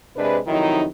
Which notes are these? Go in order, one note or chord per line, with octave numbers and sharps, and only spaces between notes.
C3 G#3 D4 B4
F2 C3 D#3 F#3 D#4 E4